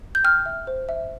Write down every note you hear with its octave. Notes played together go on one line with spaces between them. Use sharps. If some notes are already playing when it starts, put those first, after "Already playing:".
G6
G5 F6
E5
C5
E5